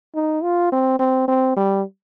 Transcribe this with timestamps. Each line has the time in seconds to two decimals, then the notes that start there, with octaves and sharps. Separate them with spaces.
0.15 D#4
0.43 F4
0.72 C4
0.99 C4
1.28 C4
1.57 G3